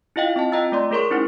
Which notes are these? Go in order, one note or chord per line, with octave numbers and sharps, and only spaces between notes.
E4 F4 D#5 F5 G5
C4 D#5 A5
F4 D#5 G5 A#5 E6 A6
A3 D5 C6
A3 G#4 A#4 C#5 C6 C#6
C#4 D#4 E4 C5 F#5